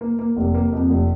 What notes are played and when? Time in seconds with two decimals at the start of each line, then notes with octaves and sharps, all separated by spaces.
0.01 A#3
0.19 A#3
0.37 F1
0.54 A#3
0.72 F2
0.90 F1